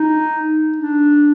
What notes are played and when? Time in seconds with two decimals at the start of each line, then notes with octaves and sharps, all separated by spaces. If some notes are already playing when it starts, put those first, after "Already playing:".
Already playing: D#4
0.78 D4